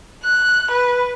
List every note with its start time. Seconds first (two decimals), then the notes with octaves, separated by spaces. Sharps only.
0.23 F#6
0.71 B4